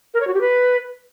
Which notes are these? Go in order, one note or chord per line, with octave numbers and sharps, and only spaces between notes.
A#4
C#5
F#4
G4
B4